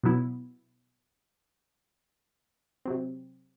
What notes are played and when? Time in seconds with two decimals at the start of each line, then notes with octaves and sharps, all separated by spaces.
0.04 B2 F#3 B3 E4
2.85 C3 F#3 C4